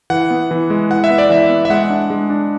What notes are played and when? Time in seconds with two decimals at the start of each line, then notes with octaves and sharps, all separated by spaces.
0.10 E3 F#5
0.30 B3
0.51 E3
0.70 G#3
0.90 E3 F#5
1.04 E5
1.10 B3
1.18 D5
1.30 E3 E5
1.49 B3
1.65 E5
1.70 G#3 F#5
1.90 D4
2.10 G#3
2.30 D4